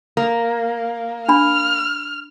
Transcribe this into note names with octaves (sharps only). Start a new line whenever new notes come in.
A#3
D4 B5 F6